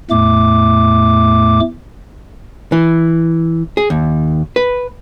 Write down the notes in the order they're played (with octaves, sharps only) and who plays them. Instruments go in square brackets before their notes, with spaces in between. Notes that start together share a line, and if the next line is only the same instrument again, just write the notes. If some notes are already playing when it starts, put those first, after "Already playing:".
[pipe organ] E2 A2 A3 D6
[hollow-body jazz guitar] E3
G#4
D#2
B4